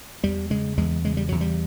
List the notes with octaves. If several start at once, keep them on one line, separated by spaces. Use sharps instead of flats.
E2 G3
C#3 G#3
E2 G#3
C#3 G#3
G3
E2 F#3
G3